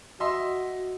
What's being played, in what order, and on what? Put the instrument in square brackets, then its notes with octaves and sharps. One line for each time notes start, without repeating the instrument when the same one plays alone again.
[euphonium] F#4 [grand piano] D#5 E5 C6